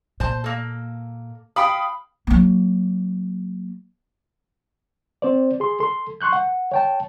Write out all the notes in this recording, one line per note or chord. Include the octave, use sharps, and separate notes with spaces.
A#2 C5 A5
A#3 A4
F5 G5 B5 D#6
F#3 A#3
C4 C5 D5
G#4 C6
A4 C6
C6 C#6 F#6 G6
F#5
C#5 G5 A5